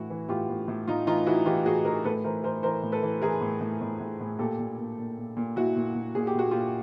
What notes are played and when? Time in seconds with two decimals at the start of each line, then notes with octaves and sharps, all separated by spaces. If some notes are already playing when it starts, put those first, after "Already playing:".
Already playing: A2 E3 E4 F#4
0.10 E3
0.29 A2 F4 G4
0.49 A2
0.68 A2
0.88 A2 D#4 F4
1.07 E3 D#4 F4
1.27 E3 E4 F#4
1.46 E3 F4 G4
1.66 A2 F#4 G#4
1.85 E3 G#4 A#4
2.04 A2 A4 B4
2.24 E3 A#4 C5
2.44 E3 A#4 C5
2.63 E3 A#4 C5
2.83 A2
2.92 A4 B4
3.03 E3
3.21 E3 G#4 A#4
3.41 A2
3.61 A2
3.81 A2
4.00 A2
4.20 A2
4.39 A#2 G4 A4
4.59 A#2
4.78 A#2
4.98 A#2
5.17 A#2
5.37 A#2
5.56 A#2 E4 F#4
5.76 A#2
5.95 A#2
6.15 A#2 G#4
6.27 G4
6.34 A#2 F#4
6.51 A#2 F4 G4